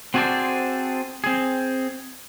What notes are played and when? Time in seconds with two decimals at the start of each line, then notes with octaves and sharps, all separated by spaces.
0.14 C4 F#4 G#4 A4 C5 D5
1.24 C4 G#4